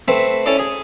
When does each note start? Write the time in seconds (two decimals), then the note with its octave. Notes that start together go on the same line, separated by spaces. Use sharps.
0.08 A3 C4 B4
0.46 C#4 E4 A4 D5
0.59 G#4